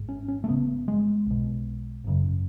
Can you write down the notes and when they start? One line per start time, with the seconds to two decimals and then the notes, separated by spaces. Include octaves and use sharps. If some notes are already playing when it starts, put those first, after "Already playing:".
Already playing: G#1 G#2
0.09 C#4
0.28 C#4
0.44 A3
0.48 G#1 F#2 C#3 B3
0.88 G#3
1.26 B1 B2
2.04 G#1 F#2 C#3